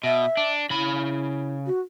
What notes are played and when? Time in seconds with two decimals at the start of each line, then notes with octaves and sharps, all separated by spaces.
0.03 B2 E5
0.37 D4
0.70 C#3 E4 B5
1.67 F#4